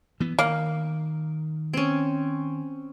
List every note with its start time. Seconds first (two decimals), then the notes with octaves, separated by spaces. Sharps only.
0.20 E3 B3
0.39 D#3 A#3
1.73 C4 C#4